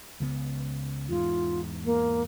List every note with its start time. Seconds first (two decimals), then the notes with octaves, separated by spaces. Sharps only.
0.20 C#2 C#3 B3
1.09 E2 G#2 F4
1.85 A#3